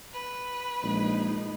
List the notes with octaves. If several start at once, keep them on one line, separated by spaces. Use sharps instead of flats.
B4
A#1 G#3 D#4